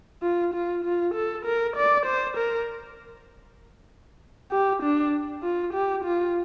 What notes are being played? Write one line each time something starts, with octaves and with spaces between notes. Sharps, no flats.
F4
F4
F4
A4
A#4
D5
C5
A#4
G4
D4
F4
G4
F4